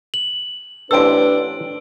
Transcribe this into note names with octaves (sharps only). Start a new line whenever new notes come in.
F#7
A1 C4 D4 A4 B4 E6 D7